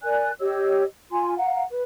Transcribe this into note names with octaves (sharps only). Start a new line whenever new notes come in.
A#4 D5 G#5 F#6
G4 C#5 D#5 E6
F4 G#5 C6
F5 F#5 A#5
B4